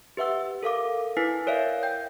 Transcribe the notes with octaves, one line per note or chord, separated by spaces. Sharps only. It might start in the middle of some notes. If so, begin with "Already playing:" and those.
G4 B4 E5 F#5 E6
A4 A#4 F5 D6
E4 B4 G#5 B6 C7
A#4 C#5 D5 E5 F5
G5 G6